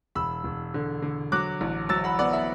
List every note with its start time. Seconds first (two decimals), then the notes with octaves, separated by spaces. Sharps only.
0.15 E1 B5 E6
0.44 E1
0.74 D3
1.02 D3
1.32 F#3 D6 F#6
1.61 A1
1.89 F#3 E6 A6
2.04 F#5 B5
2.19 B3 D5 F#5
2.33 E5